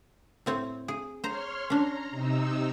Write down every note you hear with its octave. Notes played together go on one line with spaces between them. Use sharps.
A2 C4 C#5
G#4
C5 C#5 A#5 C6 F6
C#4 D4 A#5
C3 D#4 E6